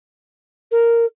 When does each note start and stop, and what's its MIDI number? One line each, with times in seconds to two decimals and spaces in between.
0.71 1.05 70